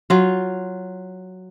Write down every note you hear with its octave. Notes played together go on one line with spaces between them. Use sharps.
F#3 F4